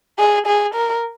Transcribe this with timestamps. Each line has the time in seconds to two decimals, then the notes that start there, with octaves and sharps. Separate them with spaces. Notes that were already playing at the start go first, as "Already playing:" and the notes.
0.19 G#4
0.47 G#4
0.74 A#4